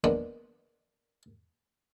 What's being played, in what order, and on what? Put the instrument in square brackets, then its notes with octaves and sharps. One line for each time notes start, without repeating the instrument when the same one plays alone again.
[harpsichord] G#3 A#3 B3 D4